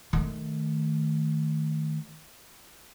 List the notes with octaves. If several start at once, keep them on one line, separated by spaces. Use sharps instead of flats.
D#3 A3